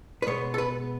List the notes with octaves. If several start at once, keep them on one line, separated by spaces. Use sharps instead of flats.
B4
B2 G#3 B3 C#5
A4
B4